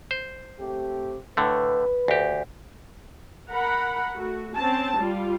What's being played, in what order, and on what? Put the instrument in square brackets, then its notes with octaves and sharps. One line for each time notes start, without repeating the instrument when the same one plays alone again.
[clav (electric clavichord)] C5
[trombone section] A3 C4 G4
[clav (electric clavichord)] A2 D3 A3 [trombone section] B4
[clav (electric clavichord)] D2 G4
[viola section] A#4 F#5 B5
A3 F#4
C4 C#4 A5
G3 F4